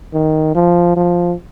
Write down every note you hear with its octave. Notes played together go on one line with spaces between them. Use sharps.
D#3
F3
F3